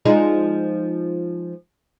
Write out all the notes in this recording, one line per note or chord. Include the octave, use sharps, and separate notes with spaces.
F3 G#3 D#4